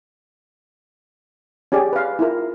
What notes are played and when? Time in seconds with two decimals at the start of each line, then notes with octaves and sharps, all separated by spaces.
1.72 C#4 G4 G#4 D5
1.93 B4 F5
2.19 E4 F4 A#4